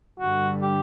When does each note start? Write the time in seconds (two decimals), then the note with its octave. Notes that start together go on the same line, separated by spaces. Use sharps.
0.19 G2 D3 G3 F#4
0.62 G4